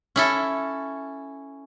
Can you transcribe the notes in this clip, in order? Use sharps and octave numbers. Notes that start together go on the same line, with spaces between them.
C#4 E4 A4